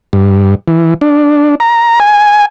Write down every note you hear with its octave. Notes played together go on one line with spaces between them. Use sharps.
G2
E3
D4
A#5
G#5